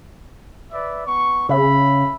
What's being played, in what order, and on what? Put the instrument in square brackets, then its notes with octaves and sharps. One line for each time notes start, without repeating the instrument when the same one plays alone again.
[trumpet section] B4 D5 E5
B3 C#6
[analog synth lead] C#3 [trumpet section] E5 B5